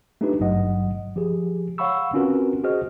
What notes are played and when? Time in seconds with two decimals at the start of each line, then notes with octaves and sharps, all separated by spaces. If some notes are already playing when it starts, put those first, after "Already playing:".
0.21 A3 D4 D#4 F4 G4 B4
0.40 G#1 G2 F#3 D#5 F#5
1.16 F3 G4 G#4
1.78 C#5 F5 F#5 B5 C#6 E6
2.13 C4 C#4 F4 F#4 A#4 B4
2.63 F4 F#4 G#4 C5 D#5 F6